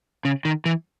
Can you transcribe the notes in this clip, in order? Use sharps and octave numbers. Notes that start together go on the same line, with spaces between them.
C#3
D#3
E3